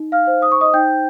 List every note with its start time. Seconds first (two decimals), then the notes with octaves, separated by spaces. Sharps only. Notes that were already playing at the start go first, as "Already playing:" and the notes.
Already playing: D#4
0.12 F5 F6
0.27 C5
0.42 D#6
0.52 C#6
0.61 D#5 D#6
0.74 D#4 G5 G6